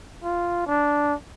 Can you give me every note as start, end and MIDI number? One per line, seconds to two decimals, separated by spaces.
0.24 0.62 65
0.66 1.14 62